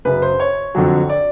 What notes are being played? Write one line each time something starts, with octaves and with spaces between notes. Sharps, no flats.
F#2 C#3 F#3 B4
C5
C#5
F2 D3 F#3
D5